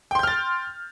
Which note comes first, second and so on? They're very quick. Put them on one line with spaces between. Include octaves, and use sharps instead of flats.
G5 C6 G6 F6 A6